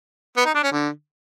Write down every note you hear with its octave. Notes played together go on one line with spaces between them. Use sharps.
B3
D#4
D4
C#4
D3